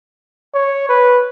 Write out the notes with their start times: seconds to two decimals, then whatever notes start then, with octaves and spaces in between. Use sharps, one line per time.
0.55 C#5
0.89 B4